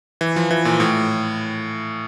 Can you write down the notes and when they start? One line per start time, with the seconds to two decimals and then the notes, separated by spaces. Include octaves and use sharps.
0.21 E3
0.36 F3
0.51 E3
0.65 A#2
0.80 A2